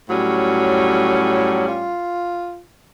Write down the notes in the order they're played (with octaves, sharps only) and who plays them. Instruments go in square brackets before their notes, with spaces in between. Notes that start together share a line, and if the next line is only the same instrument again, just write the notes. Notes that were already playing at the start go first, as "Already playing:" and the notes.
[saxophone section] A2 G3 C#4 [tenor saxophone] F#3
[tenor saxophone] F4